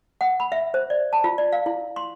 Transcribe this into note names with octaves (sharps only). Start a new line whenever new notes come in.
F#5
B5
E5
C5
D5
A5
F4
D5
F5
E4
C6